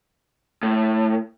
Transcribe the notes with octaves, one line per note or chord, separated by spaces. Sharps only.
A2